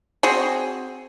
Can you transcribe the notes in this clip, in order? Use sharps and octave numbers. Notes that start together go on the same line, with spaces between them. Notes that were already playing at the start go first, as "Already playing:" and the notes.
C4 F#4 G#4